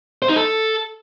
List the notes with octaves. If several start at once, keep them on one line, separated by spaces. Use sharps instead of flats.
C5
D#4
A4